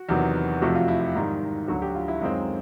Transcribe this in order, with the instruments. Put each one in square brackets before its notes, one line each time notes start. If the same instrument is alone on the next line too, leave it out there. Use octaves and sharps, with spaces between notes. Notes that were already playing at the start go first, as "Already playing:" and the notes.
Already playing: [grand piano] F#4
E2 C3 D#3 F#3 B3
F2 C3 F3 A3 F#4
F4
E4
F4
G#2 D#3 G3
D2 D3 F#3 F#4
G4
F4
E4
F#2 D#3 G#3 C4 F4